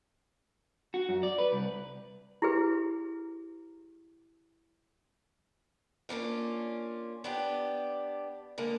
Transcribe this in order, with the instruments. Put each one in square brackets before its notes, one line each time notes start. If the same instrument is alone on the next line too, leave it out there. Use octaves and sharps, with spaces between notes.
[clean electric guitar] F#4
F#2
D5
B4
C2
[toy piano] E4 G4 G#4 B4
[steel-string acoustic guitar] A#3 C#4 D4 F4
B3 D4 G4
D3 G#3 A#3